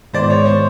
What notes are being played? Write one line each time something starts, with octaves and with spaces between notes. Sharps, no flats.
G#2 D#3 G#3 B3 E4 C5 D5
C#5
C5